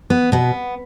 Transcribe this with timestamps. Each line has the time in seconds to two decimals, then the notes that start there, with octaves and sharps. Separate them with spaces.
0.10 B3
0.32 B2 B3